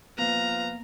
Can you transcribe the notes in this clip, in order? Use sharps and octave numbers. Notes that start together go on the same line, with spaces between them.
F3 A#3 B3 B4 F5 A#5